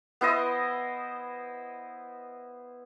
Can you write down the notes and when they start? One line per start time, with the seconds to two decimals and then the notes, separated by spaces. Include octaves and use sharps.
0.21 B3 E4 C5 D#5